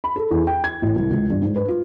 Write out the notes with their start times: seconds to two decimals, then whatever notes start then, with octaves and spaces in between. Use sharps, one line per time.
0.04 B5
0.16 A4
0.31 E2
0.47 G5
0.64 G#6
0.82 A1
0.96 C2
1.11 C#2
1.30 G2
1.42 G#2
1.56 B4
1.68 F4